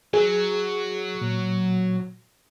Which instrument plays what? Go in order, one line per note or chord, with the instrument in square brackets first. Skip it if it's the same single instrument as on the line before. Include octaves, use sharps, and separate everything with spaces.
[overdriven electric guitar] F#3 [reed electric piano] G#4
[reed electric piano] A#2